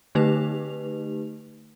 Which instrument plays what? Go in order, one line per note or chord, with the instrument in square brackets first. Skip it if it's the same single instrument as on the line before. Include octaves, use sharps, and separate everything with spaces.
[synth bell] D3 A3 D#4 G4 B4 F7